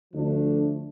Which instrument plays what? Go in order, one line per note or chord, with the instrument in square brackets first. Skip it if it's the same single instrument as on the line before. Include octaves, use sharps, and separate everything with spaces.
[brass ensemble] D2 D3 F3 A3 D4